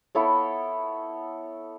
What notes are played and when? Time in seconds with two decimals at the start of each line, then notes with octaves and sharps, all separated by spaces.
0.15 B3 E4 A4 C#5